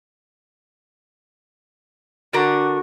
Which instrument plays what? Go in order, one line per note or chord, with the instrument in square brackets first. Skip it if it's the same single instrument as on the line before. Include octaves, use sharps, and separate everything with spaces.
[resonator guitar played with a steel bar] D3 D4 A#4 [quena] F#4